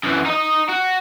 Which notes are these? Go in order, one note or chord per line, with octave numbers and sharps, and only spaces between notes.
F#2 E3
D#4 D#5
F#4